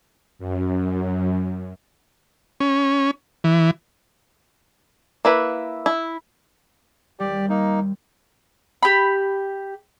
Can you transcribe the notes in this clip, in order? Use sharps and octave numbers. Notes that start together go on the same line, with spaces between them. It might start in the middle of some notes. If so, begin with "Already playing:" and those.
F#2
C#4
E3
A#3 E4 B4
E4
D#2 G3 G4 D5
A#3 D#4
G4 B5